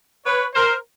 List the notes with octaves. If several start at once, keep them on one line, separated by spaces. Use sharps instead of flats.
B4 C#5
A#4 C5